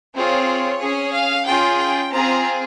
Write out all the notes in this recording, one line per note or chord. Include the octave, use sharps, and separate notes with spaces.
C4 F4 G#4 C#5
C#4 G#4
F5
C#4 F4 G#4 G5
G5
C4 F4 G#4 A#5